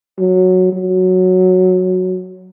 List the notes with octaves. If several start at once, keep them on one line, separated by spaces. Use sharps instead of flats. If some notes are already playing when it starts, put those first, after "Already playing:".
F#3
F#3